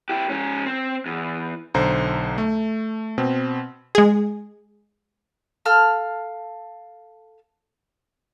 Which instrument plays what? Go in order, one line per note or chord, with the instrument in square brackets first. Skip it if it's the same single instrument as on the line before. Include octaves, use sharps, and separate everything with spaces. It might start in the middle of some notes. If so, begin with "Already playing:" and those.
[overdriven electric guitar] E4 G4
G#2 C#4
C4
E2
[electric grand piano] B1 D3 C5 A#5
A3
B2 C4
[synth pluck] G#3 G#4
[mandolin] A4 F5 E6 F6